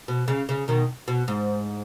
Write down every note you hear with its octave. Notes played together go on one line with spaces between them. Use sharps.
B2
C#3
C#3
B2 D#3
B2
G#2